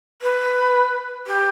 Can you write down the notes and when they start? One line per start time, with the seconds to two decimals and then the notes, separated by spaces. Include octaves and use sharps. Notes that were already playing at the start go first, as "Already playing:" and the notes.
0.22 B4
1.26 G4